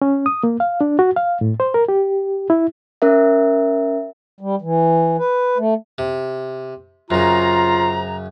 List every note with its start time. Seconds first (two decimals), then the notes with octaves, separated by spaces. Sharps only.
0.02 C#4
0.26 D#6
0.43 A#3
0.60 F5
0.81 D4
0.99 F#4
1.16 F5
1.41 A2
1.60 C5
1.74 A#4
1.88 G4
2.50 E4
3.02 C#4 A#4 E5
4.41 G3
4.62 E3
5.18 B4
5.58 A3
5.98 C3
7.11 F#2 C#3 C4 F4 G#4 A#5